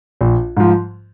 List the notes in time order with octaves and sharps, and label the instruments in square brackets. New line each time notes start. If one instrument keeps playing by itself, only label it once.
[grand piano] A#1
G#2 F3